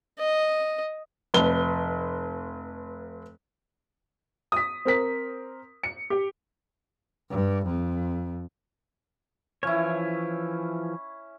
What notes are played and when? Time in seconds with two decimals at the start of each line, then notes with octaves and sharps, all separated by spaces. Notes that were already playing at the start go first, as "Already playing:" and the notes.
0.20 D#5
1.34 F1 B4 G7
4.52 D#6 B6
4.85 C4 A#4 B6
5.83 C#7
6.10 G4
7.30 G2
7.66 F2
9.63 E3 F3 C#4 E4 C#5